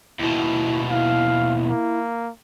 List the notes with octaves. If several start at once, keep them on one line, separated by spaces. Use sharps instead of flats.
D#2 B2 E4
E4 F5
A#3